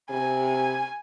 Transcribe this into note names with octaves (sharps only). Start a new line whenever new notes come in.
C3 G#5